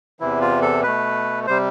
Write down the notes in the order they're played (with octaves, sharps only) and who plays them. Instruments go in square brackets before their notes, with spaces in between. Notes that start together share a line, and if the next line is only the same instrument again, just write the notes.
[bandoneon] E2 C3 E3 E4
F4
A4
B2 A3 B4
C3 G3 C5